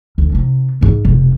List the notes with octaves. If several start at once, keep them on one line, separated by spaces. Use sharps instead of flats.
D2
C3 D#3
G#2 G#3
F1 B2